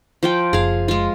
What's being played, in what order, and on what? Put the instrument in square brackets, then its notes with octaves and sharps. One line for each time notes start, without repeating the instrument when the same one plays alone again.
[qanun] F3 F4 G5
[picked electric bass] F#1 [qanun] G#4 F5
[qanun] G#3 F4